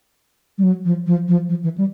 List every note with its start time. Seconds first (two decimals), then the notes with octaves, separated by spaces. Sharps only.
0.58 G3
0.63 F#3
0.85 F3
1.06 F3
1.28 F3
1.49 F3
1.64 E3
1.78 G3